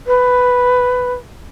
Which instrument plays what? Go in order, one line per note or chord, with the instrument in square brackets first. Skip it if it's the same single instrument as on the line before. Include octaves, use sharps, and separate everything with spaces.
[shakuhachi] B4